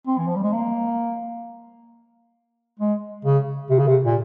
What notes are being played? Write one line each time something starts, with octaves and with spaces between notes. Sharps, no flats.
C4
E3
F3
G3
G#3
A#3
G#3
C#3
C3
C#3
C3
A#2